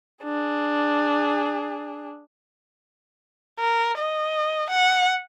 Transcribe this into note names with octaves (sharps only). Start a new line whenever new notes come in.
D4 G#4
A#4
D#5
F#5